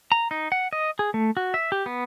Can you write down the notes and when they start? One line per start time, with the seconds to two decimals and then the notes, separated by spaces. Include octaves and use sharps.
0.12 A#5
0.31 D#4
0.52 F#5
0.73 D#5
0.99 G#4
1.14 A3
1.37 F#4
1.54 E5
1.72 G4
1.86 B3